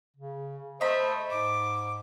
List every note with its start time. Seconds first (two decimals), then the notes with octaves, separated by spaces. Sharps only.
0.16 C#3
0.81 A3 C5 D#5 B5
1.30 G#2 D6